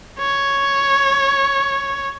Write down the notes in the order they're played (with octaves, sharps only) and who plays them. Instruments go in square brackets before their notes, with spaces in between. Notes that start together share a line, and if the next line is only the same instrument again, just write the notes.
[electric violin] C#5